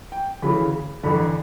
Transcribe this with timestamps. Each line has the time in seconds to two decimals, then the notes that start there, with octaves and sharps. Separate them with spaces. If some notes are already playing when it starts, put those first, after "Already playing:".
0.12 G5
0.42 D2 C#3 E3 B5
1.03 A1 G2 D3 B5